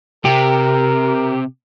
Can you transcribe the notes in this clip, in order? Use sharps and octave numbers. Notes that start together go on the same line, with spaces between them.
C3 G4 A#4